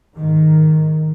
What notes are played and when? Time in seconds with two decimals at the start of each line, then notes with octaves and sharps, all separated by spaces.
0.17 G#2 D#3